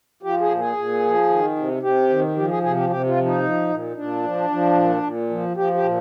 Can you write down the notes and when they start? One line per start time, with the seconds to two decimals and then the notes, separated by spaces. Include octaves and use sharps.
0.23 F3 G4
0.40 G#4
0.50 A#2
0.58 G#4
0.77 A#2
1.03 F3
1.29 D#3
1.56 C3
1.83 C3 G4
2.09 D#3
2.36 F3 G4
2.50 G#4
2.63 C3 G#4
2.76 G4
2.90 C3 G4
3.07 F4
3.16 F3
3.25 D#4
3.43 F3
3.69 A#2
3.96 A#2 D4
4.23 F3
4.50 F3
4.76 A#2
5.03 A#2
5.30 F3
5.56 F3 G4
5.74 G4
5.83 A#2